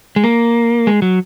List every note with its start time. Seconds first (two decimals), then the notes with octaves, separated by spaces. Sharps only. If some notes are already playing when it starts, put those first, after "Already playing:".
0.16 G#3
0.24 A#3
0.87 G#3
1.02 F#3